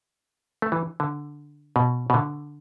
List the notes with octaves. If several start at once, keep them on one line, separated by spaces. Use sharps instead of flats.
A3
E3
D3
B2
B2
D3